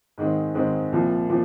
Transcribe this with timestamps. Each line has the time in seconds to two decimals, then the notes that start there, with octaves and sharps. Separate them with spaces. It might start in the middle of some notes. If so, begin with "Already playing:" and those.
0.18 G#2 D#3 G#3 C4
0.55 G#2 D#3 G#3 C4
0.92 C2 A#2 F3
1.30 A#2 F3